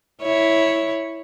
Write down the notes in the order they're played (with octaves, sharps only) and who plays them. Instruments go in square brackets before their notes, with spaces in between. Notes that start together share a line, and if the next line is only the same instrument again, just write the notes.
[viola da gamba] E4 C#5